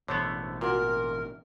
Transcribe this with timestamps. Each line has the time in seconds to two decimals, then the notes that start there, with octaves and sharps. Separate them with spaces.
0.08 A1 B2 D3 E3 A3 B3 C5 C#5
0.61 A#2 F4 F#4 A#4